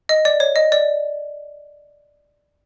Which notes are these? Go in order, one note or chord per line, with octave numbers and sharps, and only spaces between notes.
D#5
D5
C#5
D#5
D5